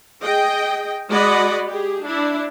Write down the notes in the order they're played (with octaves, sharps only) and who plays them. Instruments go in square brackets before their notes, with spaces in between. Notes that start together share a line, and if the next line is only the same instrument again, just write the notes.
[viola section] G#4 D#5 G5
G#3 F#4 D5 D#5 F#5 B5
G4 G#4
D4 E4